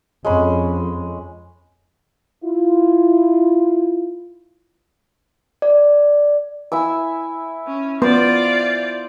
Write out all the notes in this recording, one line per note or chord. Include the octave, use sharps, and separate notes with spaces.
F2 G#3 C#4 B5
E4 F4
D5
E4 G#5 E6
C#4
B3 F4 C5 D5